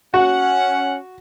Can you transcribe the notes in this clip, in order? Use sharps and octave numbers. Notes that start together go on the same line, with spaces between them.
C#4 F#4 F#5